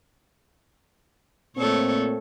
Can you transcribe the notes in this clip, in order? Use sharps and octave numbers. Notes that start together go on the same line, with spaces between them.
A#2 A3 C4 A4 C#5